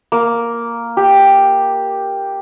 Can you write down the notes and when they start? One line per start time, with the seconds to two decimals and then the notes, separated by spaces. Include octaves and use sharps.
0.12 A#3
0.97 G4